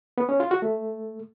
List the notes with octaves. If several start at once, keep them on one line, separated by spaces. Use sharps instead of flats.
B3
C#4
F4
F#4
A3